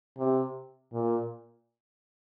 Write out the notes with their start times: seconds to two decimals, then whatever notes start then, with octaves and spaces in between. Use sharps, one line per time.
0.18 C3
0.92 A#2